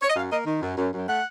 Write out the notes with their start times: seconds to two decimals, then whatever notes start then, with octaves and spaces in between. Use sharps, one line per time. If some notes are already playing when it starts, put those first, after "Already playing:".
0.02 C#5
0.10 D#5
0.16 F#2 F5
0.31 A#3 D#5
0.46 D#3
0.62 F#2
0.78 F#2
0.93 F#2
1.08 A3 F#5